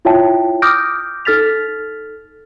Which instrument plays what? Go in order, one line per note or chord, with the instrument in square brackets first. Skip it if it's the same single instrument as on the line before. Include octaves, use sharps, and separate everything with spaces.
[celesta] E4 F4 C#5 E5 G5 A5
D6 D#6 F6 G6 A#6 D7
D#4 A4 F6 A6 B6 F7